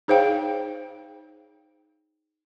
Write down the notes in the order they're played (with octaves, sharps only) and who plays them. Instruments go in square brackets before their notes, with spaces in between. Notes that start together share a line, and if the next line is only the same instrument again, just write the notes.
[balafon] D#4 G#4 C5 C#5 F5 G5